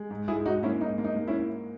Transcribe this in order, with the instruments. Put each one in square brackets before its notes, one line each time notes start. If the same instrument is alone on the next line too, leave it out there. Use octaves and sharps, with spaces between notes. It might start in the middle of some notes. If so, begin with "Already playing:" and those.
Already playing: [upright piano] G#3
G#2
[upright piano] G#2 [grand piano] E4 G#4
[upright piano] G#2 [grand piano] D#4 F#4
[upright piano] A#3 [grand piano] C#4 E4
[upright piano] G#2 [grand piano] D#4
[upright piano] A#3
[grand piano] D#4
[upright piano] A#3
[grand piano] C#4 E4